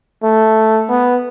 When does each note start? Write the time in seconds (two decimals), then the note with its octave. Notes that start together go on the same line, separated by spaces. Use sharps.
0.24 A3
0.89 B3